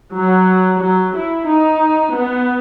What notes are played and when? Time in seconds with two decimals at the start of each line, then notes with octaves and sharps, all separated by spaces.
0.15 F#3
0.81 F#3
1.14 E4
1.48 D#4
2.13 B3